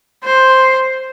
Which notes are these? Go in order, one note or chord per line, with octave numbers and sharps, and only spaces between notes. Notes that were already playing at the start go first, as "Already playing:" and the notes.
C5